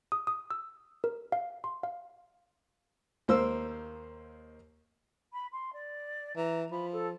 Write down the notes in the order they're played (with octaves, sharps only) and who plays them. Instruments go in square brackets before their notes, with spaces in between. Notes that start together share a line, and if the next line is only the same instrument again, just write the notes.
[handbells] D#6
D#6
E6
A#4
F5
C6
F5
[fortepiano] D#2 A#3 C5 E6
[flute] B5
C6
D5
[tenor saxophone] E3 [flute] A#5
[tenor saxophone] F3 [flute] B5
[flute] A4